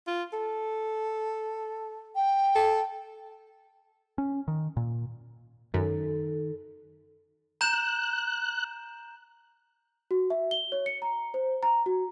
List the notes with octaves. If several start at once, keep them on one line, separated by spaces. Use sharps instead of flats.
F4
A4
G5
A4
C#4
D#3
A#2
F#2 D#3 A4
A#5 F#6 G6 E7
F#4
E5
G7
C#5
C#7
A#5
C5
A#5
F#4